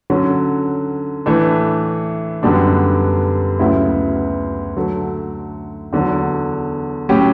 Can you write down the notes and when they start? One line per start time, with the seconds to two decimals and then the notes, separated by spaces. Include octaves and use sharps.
0.10 D3 F#3 C#4
1.26 A2 E3 A3 D4
2.43 F#2 D3 G3 B3 D4
3.59 D2 C#3 F#3 B3 E4
4.77 D3 F#3 A3
5.93 E2 D3 F#3
7.09 A2 F#3 C#4 G4